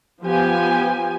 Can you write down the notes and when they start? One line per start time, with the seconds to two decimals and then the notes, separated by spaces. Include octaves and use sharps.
0.23 F3 B3 F4 G4 G#5